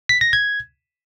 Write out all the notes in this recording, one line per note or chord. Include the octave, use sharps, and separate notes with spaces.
B6
A#6
G#6